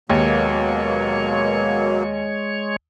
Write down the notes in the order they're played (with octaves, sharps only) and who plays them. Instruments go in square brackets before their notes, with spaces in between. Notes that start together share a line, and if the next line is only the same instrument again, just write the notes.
[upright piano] D#2 [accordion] B2 F#3 A#3 [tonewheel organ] G#3 C#5